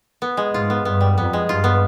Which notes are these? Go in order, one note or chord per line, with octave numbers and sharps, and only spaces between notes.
B3
G#3
G#2 F4
B3
G2 B3
G3
F2 B3
G#3
G2 F4
B3